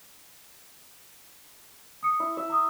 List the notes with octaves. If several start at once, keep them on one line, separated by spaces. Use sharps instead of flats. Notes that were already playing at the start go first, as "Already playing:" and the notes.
D#6 C#7
E4
E4 E5
A#5 D#6